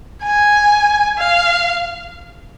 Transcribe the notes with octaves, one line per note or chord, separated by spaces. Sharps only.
G#5
F5